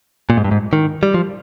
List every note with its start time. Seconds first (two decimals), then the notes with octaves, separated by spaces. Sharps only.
0.30 A#2
0.37 G#2
0.44 G2
0.51 G#2
0.73 D#3
1.03 G3
1.14 F3